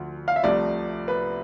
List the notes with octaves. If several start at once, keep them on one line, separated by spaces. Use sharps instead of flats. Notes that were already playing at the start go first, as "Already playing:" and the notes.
Already playing: D2 D3 F3
F5
E5
C2 C3 F3 A3 D5
B4